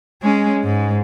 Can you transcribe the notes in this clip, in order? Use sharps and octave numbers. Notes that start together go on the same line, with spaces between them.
G#3 C#4
G#2